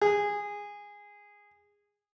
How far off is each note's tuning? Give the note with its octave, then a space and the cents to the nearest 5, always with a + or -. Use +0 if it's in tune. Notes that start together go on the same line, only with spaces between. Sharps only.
G#4 -15